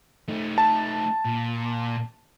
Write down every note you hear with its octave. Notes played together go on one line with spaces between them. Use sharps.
A3 D#4
A5
A#2